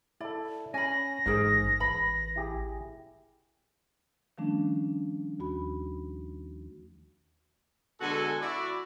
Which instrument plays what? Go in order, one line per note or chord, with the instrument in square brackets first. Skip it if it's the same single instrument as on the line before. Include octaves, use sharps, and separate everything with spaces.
[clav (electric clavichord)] E4 A4 [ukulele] D5
[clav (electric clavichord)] C#4 [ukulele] G#5 B5 [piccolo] A#6
[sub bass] A1 [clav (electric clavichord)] G#2 [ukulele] G#4 A#4 C5
[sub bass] A1 [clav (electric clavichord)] B4 [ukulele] B5
[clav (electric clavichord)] E4 G4 G#4
[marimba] D#3 F3 G3 A3 C#4 D4
D#2 F#4 B5
[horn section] B2 D3 G#3 F#4 A4 G#5
E4 F#4 D5